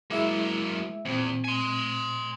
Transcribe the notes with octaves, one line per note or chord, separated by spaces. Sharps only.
F#3 G#3 A#3 E4 E5
E2 A#2 C4
G#5 C6